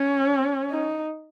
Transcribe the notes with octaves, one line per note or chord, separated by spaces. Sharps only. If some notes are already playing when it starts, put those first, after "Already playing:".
Already playing: C#4
D#4